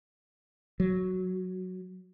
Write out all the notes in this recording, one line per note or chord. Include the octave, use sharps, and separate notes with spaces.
F#3